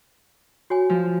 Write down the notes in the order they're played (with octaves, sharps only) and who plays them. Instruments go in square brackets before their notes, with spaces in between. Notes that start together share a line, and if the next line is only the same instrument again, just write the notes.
[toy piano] F#4 C#5 G#5
[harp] F3